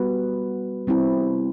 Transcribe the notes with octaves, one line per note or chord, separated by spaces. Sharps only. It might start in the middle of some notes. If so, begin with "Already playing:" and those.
Already playing: G3 B3 F#4 B4
G3 C4 E4